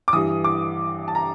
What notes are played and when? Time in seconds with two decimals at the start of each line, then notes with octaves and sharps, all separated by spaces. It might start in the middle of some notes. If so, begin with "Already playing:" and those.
0.08 D6
0.13 G2 E3 D#6
0.44 D6
1.08 A5
1.15 A#5